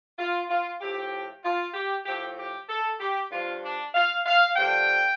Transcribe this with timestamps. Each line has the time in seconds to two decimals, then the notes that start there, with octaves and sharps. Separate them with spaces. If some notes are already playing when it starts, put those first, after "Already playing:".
0.18 F4
0.49 F4
0.81 A2 F3 G4
1.44 F4
1.74 G4
2.06 A2 F3 G4
2.38 G4
2.68 A4
3.00 G4
3.31 G2 F3 F4
3.62 D4
3.94 F5
4.26 F5
4.56 G2 D3 F3 G5